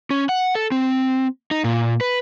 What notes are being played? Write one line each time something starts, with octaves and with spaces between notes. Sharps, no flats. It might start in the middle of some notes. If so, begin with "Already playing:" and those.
C#4
F#5
A4
C4
D#4
A#2
B4